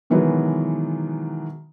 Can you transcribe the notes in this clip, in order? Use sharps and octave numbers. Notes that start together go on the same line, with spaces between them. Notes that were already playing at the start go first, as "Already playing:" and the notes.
B2 D#3 E3 F#3 G#3 B3